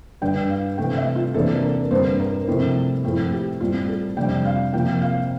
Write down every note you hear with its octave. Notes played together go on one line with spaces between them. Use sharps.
G2 D3 G3 D4 G5
F5
C3 E3 A3 G5
E5
F4
E2 C3 E3 A#3 D4 A4
A#4
G2 D3 G3 C4 C5
A#4
C3 F3 A3 C4 E4
A2 F3 A3 C4 E4 A4
G4
A2 G3 C4 F4
A4
F2 C3 G3 D4 G5
F5
C3 F3 A#3 G5
F5